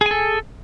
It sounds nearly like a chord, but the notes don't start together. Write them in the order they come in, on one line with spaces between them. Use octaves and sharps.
G#4 G#5 A4